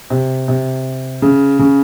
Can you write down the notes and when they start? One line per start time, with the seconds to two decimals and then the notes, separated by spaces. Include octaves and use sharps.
0.10 C3
0.48 C3
1.22 C#3
1.59 C#3